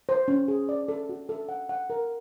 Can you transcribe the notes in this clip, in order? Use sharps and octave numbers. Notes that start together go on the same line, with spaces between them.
C5
C#4
G#4
D5
A4
F#4
A4
F#5
F#5
A#4